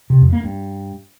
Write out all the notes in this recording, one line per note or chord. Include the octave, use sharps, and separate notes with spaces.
C3
F2
A#3
G2